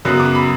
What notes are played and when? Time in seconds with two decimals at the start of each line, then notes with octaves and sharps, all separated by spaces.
0.05 F#2 C#3 F#3 B3 F#6
0.20 D6
0.35 B5